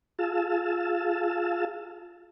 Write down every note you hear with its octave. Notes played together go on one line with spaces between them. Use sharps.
F4 G#4 F5 A5 E6